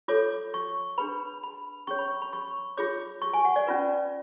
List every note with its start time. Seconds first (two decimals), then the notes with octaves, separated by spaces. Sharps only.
0.08 F4 A4 C#5 D6
0.54 C#6
0.98 D4 G#4 B4 B5
1.43 B5
1.87 C#4 G#4 C#5 C#6
1.98 B5
2.22 B5
2.33 C#6
2.77 F4 G#4 C#5 D6
3.22 C#6
3.33 G#5
3.45 F#5
3.56 D5
3.67 C#4 F4 B4